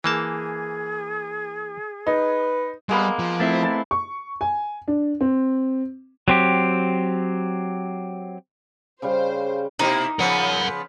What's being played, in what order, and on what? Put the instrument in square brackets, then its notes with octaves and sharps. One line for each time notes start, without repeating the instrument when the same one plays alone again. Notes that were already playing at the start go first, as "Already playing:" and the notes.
[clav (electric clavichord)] E3 A#3 A5 [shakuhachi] G#4
[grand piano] D#4 [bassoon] B4
[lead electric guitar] G3 [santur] G#3 A#3 B3
[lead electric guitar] F3
[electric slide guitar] A3 C4 E4
[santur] A5
[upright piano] C#6
G#5
D4
C4
[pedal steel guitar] F#3 C4 G4
[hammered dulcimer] C#3 G3 F5 [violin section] C5
[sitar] B2 A#3 E4 [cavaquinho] D#4
[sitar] C#3 F3 B3 [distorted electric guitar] A#4 F#5